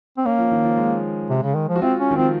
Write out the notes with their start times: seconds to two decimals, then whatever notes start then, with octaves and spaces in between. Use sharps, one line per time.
0.17 C4
0.25 A#3 C#4
0.38 F3
0.52 D#3
0.65 F3
0.77 G#3
1.30 C3
1.43 C#3
1.55 D#3
1.69 F3
1.76 F#4
1.82 C4 F4
2.00 C#4
2.11 D#3
2.16 F3 C4